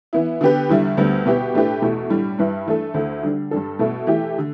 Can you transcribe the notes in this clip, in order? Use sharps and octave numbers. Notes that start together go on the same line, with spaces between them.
E3 B3 E4
D3 B3 G4 B4
E2 D3 G3 E4
D2 D3 G3 B3
B2 B3 E4 G4 B4
A2 A3 D4 G4 B4
E2 B2 A3
A2 G3 D4
G2 G3 E4 B4
E3 A3 D4 A4
D2 D3 A3 E4
D3 G3 D4
G2 G3 D4 A4
B2 A3 E4 A4
E3 A3 E4 G4
D3